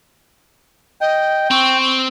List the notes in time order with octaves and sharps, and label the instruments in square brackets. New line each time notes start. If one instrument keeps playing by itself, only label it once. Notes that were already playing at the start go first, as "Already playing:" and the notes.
[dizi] D#5 [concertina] G5
[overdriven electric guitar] C4 [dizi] C#6